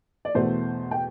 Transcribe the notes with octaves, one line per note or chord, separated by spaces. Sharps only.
D5
E2 B2 A3 C5
G5